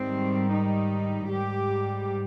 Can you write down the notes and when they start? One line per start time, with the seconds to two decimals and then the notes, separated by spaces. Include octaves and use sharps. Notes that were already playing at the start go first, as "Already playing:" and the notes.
Already playing: G#2 D#3 G3 C4
0.53 D#4
1.29 G#2 G3 G4